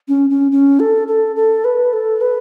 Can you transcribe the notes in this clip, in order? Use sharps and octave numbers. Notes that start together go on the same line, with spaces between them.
C#4
C#4
C#4
A4
A4
A4
B4
A4
B4